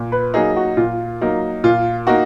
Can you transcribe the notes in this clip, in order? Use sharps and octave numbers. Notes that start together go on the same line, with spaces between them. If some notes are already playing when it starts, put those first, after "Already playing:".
Already playing: A#2
B4
F#3 A#3 D#4 G#4
F#4
A#2 F4
F#3 A#3 D#4
A#2 F4
A#3 D#4 F#4